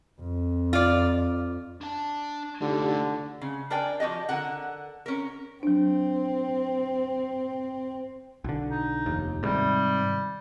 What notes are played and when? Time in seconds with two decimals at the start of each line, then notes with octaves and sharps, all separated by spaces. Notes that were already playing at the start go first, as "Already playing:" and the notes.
0.21 F2
0.73 F4 D5
1.81 D4 A5
2.62 D3 A3 D#4 F4 G4
3.42 C#3
3.70 D4 A#4 D5 G5 G#5
4.00 F3 F#4 G4 D#5
4.29 D3 A#4 F#5
5.06 C#4 A#4
5.63 F#3 C4 D4
8.44 B1 D3
8.70 D#4
9.06 F1 D#2
9.43 G#2 C3 D#3 G3